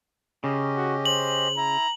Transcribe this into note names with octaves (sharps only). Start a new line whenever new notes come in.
C#3 C#4 G4 D#5
F#4
C5 F#7
E4 A#5